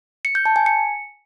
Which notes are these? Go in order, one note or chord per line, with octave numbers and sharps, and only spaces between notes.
C#7
G6
A5
G#5
C#7